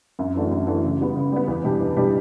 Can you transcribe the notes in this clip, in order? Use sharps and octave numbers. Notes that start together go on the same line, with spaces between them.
F#2
E3 A3 D4 F#4
F#2
E3 A3 D4 F#4
C#3
G3 B3
C#3
G3 B3
E2
B2 G3 D4 G4
E2
B2 G3 D4 G4